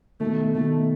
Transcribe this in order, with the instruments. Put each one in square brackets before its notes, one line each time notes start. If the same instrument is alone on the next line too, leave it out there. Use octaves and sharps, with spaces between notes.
[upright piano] B2 D#3 [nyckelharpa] A3
[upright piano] B2 D#3 [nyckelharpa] A3